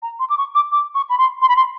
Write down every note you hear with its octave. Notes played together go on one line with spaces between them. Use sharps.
A#5
C6
D6
C#6
D6
D6
C#6
B5
C6
C6
B5
C6